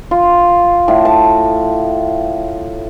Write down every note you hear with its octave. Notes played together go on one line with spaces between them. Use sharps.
F4
A2
A5